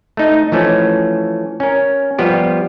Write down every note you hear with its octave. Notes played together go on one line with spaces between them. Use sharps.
A3 D#4
E3 F3 A3 C#4
C#4 A#4
F3 G3 B3 F4 G4